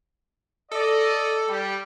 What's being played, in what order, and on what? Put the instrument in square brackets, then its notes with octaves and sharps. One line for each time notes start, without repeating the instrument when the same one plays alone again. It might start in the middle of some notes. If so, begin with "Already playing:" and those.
[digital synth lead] A4 [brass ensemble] D5 D#5
[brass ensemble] G3